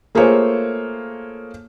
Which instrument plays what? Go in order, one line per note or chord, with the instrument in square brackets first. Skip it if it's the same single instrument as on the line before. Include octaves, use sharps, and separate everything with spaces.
[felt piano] A3 A#3 F4 G#4 C5 C#5